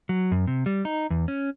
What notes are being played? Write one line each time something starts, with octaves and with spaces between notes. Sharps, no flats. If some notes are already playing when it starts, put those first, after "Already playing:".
F#3
F#2
C3
G3
D#4
E2
C#4